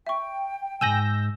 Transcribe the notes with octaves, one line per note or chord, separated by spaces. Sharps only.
E5 G5 C#6
B1 G#2 G#5 E6 G6 A#6 D#7 F#7